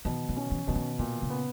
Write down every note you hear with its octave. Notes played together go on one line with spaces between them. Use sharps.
B2 D#3
D#3
C#4
E3
B2 E3
D#3
A#2 D#3
C#3
B3